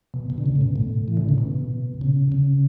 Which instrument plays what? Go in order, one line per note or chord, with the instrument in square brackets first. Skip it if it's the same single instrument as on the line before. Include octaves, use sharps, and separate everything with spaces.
[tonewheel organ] B2
B2
D3
C#3
A2
B2
A2
E3
D3
C#3
B2
C#3
C#3